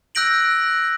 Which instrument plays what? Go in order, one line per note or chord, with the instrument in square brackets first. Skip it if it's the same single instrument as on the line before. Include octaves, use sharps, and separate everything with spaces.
[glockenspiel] E6 F#6 G6 A#6 D7 F#7